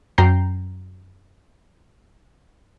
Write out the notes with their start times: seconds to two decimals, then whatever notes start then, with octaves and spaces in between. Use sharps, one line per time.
0.18 F#2 G5 A#5 G6 C7